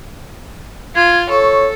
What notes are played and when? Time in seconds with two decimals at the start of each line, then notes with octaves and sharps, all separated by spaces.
0.95 F4 G#6
1.30 A4 C#5 C#6